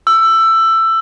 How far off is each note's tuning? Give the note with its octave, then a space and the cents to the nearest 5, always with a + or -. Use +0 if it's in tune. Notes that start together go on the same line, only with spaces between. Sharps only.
E6 +15